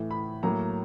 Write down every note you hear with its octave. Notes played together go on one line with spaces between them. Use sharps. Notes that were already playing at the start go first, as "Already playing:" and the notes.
Already playing: A2 E3 A3
B5
A2 F#3 A#3 A#5